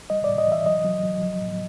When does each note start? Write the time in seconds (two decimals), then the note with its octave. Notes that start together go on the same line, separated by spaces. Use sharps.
0.10 G3 D#5
0.24 A2 D5
0.38 D#5
0.47 E3
0.52 E5
0.66 F#3 D#5
0.85 F#3
1.03 F#3
1.22 F3
1.41 A2